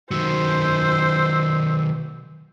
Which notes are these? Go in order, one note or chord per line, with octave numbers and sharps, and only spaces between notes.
D#3 F#3 C5 E6